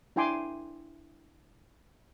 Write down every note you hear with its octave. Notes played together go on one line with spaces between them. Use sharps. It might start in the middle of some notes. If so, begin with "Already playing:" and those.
D4 E4 G5 G#5 C6 D6